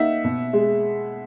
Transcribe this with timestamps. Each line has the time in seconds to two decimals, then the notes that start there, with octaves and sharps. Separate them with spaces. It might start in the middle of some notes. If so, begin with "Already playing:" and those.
Already playing: A#3 D#4 E5 F#5
0.24 B2
0.53 G#3